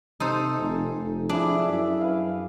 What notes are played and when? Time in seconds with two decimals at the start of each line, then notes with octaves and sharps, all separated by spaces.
0.20 C3 D#4 A4 C5
0.59 F1 G#5
0.96 F1
1.29 F3 D4 E4 G#4
1.68 F#2 E5
2.01 B4 D5 F5